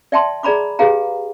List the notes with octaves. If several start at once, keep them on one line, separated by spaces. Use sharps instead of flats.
D5 E5 G5 A5 C6
G#4 D5 A#5 B5 D6
G4 G#4 B4 F5 G5 A#5